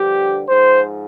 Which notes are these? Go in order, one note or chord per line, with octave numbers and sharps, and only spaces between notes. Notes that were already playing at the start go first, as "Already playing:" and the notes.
Already playing: G2 D3 F3 G4
G#2 F3 C5